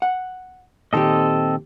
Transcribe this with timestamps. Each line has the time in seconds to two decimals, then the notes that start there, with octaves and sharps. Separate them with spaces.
0.02 F#5
0.93 A#2 D#3 C4 G4 A4 D#5